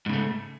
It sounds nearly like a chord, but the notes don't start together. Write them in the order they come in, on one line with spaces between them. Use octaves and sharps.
G#2 C#3 A3